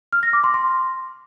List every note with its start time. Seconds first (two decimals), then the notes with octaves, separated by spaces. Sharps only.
0.13 F6
0.23 A#6
0.33 D6
0.44 C6
0.54 C6